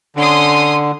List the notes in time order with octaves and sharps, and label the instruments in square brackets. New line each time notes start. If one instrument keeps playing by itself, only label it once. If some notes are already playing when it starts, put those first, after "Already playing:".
[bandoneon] D3 [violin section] C#4 C6 D#6